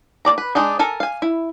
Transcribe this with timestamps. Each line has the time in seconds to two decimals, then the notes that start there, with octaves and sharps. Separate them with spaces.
0.25 A#3 G#4 D5 A#5
0.38 B4
0.55 G#3 D4 D#4 G#4
0.79 A4 A#4 G#5
1.00 F5 G#5
1.22 E4